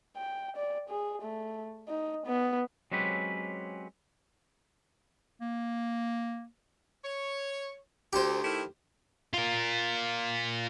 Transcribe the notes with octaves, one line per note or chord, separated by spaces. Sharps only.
G5
D5
G#4
A3
D#4
B3
F#3 G#3 C4 C#4 G4 B4
A#3
C#5
D2 G4 C5
D#3 A3 E4
F4 A#4